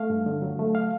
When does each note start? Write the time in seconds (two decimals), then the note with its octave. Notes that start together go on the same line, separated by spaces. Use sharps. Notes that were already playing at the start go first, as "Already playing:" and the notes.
Already playing: A3 F5
0.10 G2
0.26 D3
0.42 F#3
0.59 A3
0.75 F5